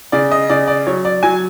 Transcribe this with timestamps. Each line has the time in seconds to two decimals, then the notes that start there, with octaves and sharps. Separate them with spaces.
0.12 C#3 D5
0.31 D#5
0.50 C#3 D5
0.68 D5
0.87 F#3 C#5
1.05 D5
1.23 F#3 G#5